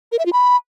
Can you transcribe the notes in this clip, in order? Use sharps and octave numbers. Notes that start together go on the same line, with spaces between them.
A#4
E5
F4
B5